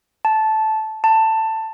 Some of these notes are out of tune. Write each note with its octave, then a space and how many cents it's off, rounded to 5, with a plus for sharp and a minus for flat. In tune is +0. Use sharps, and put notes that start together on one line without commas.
A5 -10
A5 +15